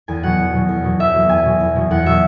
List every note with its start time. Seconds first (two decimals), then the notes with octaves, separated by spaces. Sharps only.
0.08 E2 G#5
0.23 B2 F#3 F#5
0.39 E2
0.54 B2 F#3
0.69 E2
0.84 B2 F#3
1.00 E2 E5
1.15 B2 F#3
1.29 E2 G#5
1.45 B2 F#3
1.60 E2
1.76 B2 F#3
1.91 E2 F#5
2.05 B2 F#3 E5